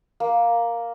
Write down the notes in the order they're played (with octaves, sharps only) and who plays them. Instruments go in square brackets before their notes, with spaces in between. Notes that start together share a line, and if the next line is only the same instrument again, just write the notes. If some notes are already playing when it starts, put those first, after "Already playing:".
[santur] A#3